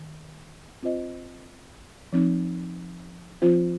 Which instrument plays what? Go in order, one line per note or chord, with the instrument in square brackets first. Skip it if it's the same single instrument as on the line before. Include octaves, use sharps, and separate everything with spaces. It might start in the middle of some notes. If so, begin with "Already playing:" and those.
Already playing: [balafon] D#3
C4 F4 C5 D#5
F3 C4 D#4
F3 C4 F4 C5